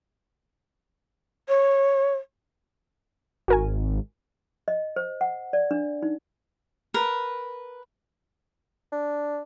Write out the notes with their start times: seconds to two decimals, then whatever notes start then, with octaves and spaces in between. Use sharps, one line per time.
1.48 C#5
3.48 G#1 F#4 A#4 G#5
4.68 D#5
4.96 C5
5.21 F#5
5.53 D5
5.71 D4
6.03 D#4
6.94 A#4 B4
8.92 D4